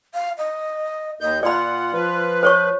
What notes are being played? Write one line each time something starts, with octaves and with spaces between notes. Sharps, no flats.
F5
D#5
D#2 D#5 G6
A#2 F4 D5 F#5 B5
F3 B4
C5 C#5 C#6